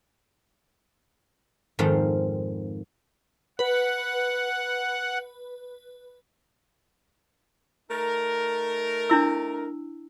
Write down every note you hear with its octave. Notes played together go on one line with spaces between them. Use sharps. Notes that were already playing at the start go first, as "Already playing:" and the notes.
F2 G#2 D#3 C4 F5
B4 F#5
A3 D#4 A#4
D4 E4 E6